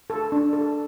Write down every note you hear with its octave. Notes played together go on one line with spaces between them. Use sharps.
A4
D4
A4